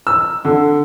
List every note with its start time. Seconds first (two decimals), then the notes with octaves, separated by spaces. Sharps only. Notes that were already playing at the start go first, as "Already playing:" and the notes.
0.07 E6
0.45 D3